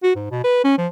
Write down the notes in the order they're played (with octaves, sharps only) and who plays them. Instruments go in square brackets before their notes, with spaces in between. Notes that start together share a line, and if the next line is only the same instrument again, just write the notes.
[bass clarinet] F#4
G#2
B2
B4
C#4
F3